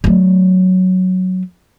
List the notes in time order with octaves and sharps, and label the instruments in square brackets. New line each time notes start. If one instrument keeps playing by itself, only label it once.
[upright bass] F#3 A3